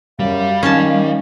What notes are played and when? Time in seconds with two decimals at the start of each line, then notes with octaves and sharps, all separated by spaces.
0.19 F#2 G3 F5
0.63 D#3 C#4 A5